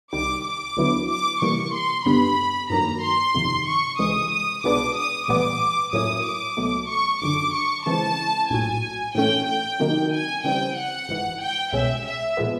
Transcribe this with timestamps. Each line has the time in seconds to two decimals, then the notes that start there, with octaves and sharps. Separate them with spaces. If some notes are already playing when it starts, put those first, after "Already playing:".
0.13 C2 C3 D#3 G3 D6
0.45 D6
0.77 D2 D3 F#3 B3 E4
1.09 D6
1.41 C3 E3 G3 A#3 C#6
1.74 C6
2.05 G1 G2 D3 G3 B3 B5
2.70 G2 D#3 F#3 A#3 A#5
3.03 C6
3.34 G1 F2 C3 D#3
3.67 C#6
3.99 C#2 C3 E3 G#3 D#6
4.32 D#6
4.64 C2 B2 G#3 B3 D4 D6
4.96 D#6
5.28 A#1 A2 E3 G3 B3 D6
5.93 A2 F#3 A#3 C#4 E4 D#6
6.25 D6
6.57 C#2 B2 F#3 A3
6.89 C#6
7.21 G1 F#2 D3 D6
7.54 C#6
7.86 C#3 E3 G#3 C4 E4 A5
8.50 A#1 A2 F#3 G#5
9.14 A2 E3 A3 C#4 G5
9.48 G5
9.80 C3 D#3 F#3 A#3 D#4
10.12 G#5
10.43 C#3 E3 G3 C4 G5
10.76 F#5
11.09 G#1 G#2 E3
11.41 G5
11.73 C2 B2 G#3 C#4 E5
12.06 E5
12.37 A#2 F3 G#3 B3